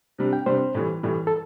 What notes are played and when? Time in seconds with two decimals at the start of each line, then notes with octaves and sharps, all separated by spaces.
0.18 C3 G3 D4
0.33 G5
0.46 C3 G3 D4 C5
0.74 A2 E3 G3
1.03 A2 E3 G3
1.27 A4